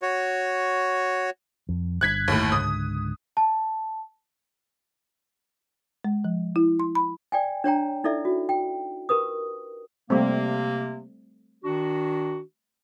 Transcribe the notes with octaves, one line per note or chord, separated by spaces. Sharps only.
F#4 C#5
F2
G1 G2 F#6 G#6 B6
G1 D#2 A2
C#2 G#2 D3 D#6
A5
G#3
F3
E4
C6
B5
D5 G5 G#5
D4 C#5 G5 A#5
D#4 E4 A4 D5 E5
F#4
G5
G4 A#4 B4 D#6
C3 G3 A3 A#3 C4
D#3 D4 F#4